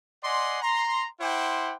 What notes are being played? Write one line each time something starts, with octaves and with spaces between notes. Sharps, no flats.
D5 D#5 F#5 G#5 C6
A#5 C6
E4 C5 F#5 G5 C6 D6